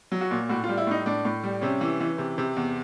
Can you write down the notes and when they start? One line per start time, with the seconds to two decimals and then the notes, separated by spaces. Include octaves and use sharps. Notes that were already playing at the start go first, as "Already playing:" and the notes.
0.12 F#3
0.21 F#4
0.31 A#2
0.49 A2 F#4
0.64 G3 F4
0.78 E4
0.87 A2 D#4
1.06 A2 D4
1.25 A2
1.43 G3
1.62 C3 C#4
1.81 E3
2.00 E3
2.18 C3
2.38 C3
2.56 E2